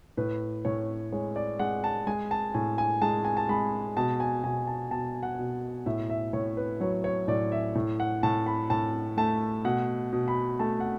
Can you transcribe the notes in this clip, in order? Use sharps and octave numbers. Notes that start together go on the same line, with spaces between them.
A2 B4
A2 C#5
G#3 C#5
D5
G#3 F#5
A5
G#3 G#5
A5
A2 G#5
G#5
G#3 A5
G#5
A5
G#3 B5
B2 A5
G#5
B2 G#5
A5
B2 A5
F#5
B2
A2 E5
E5
A2 C#5
B4
F#3 C#5
C#5
A2 D5
E5
A2
F#5
A2 A5
B5
A2 A5
A3 A5
B2 F#5
B2
B5
A3 A5
F#5